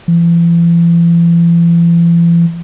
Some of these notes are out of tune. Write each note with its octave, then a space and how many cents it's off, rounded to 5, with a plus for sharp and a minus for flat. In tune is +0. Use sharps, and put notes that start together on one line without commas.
E3 +45